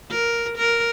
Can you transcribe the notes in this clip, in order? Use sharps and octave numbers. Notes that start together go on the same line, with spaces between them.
A#4
A#4